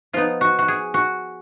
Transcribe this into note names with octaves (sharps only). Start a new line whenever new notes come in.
F3 B3 D#4 F4
F#4
F#4
G#4
F#4